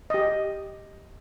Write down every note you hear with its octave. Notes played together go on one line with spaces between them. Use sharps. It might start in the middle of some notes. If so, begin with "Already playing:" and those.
G4 D#5